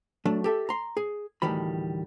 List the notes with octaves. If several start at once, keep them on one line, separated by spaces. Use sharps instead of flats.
F#3 A3 D4
G4 A4 E5
A#5 C6
G#4
D2 A2 D#3 E3 G3 B5